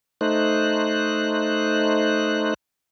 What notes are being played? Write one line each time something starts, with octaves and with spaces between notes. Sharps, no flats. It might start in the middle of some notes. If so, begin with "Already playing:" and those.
A3 D#4 C5 F#6